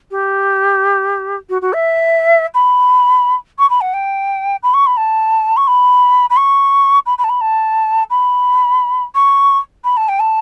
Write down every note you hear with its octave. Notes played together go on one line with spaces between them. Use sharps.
G4
F#4
F#4
E5
B5
C#6
B5
F#5
G5
B5
C#6
B5
A5
C#6
B5
B5
C#6
B5
B5
A5
B5
A5
B5
C#6
B5
A5
G5
A5